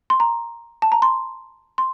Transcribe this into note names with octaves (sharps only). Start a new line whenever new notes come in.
C6
A#5
A5
A#5
C6
C6